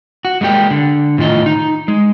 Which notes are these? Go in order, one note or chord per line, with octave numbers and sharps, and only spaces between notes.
F#4
G#3 A#3 D4 G4
D3
A2 D#3 F4 D#5
D#4
G#3